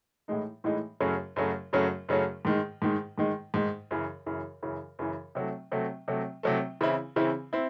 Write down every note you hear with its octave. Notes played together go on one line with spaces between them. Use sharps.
A2 E3 G#3 D#4
A2 E3 G#3 D#4
F#2 C#3 F#3 A3 C#4
F#2 C#3 F#3 A3 C#4
F#2 C#3 F#3 A3 C#4
F#2 C#3 F#3 A3 C#4
G#2 D#3 G#3
G#2 D#3 G#3
G#2 D#3 G#3
G#2 D#3 G#3
F#2 C#3 E3
F#2 C#3 E3
F#2 C#3 E3
F#2 C#3 E3
C3 F#3 A3
C3 F#3 A3
C3 F#3 A3
C3 F#3 A3
C#3 E3 C4 E4
C#3 E3 C4 E4
C4 E4